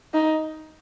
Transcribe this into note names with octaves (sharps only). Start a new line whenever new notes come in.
D#4